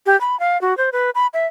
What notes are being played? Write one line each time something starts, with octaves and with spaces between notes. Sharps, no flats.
G4
B5
F5
F#4
C5
B4
B5
E5